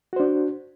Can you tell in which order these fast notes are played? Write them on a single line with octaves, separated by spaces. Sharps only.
F#4 C5 D4